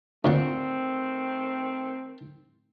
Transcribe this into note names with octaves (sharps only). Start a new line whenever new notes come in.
D2 A#2 D#3 A3 C4 F#5